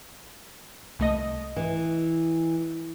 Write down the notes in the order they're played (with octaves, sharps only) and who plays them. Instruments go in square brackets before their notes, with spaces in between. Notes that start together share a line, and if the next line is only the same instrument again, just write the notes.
[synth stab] C2 A3 D#5
[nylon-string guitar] E3